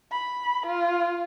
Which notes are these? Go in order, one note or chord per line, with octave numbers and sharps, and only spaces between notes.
B5
F4